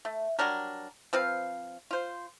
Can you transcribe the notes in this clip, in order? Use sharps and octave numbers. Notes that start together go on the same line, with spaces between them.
A3
F#3 G3 D4 A#4
F3 C4 B4 F5
F4 C5